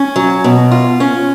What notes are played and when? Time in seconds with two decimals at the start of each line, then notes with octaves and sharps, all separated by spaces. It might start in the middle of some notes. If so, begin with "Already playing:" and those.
Already playing: C#4
0.16 F#3
0.44 B2
0.71 F4
1.00 C#4